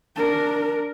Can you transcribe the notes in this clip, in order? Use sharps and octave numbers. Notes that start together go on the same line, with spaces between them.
D4 A#4